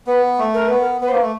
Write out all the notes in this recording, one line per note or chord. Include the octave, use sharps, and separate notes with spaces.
B3 B4
A3
A#4
B3 B4
A#4
B3 B4
C5
A#3 B4
A3